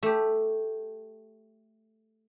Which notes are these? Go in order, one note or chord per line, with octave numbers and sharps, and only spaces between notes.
A3 G4